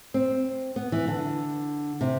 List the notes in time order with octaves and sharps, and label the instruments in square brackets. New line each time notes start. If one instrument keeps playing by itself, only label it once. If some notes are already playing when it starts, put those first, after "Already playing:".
[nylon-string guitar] C4
B3
E3
D3
C3